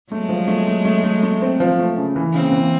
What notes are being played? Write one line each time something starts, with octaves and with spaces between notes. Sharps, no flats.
F#3 G#3 A3
F3
A3
A3
A3
A3
A3
C4
F3
A3
C#3
E3
C#3 A#3 C4
E3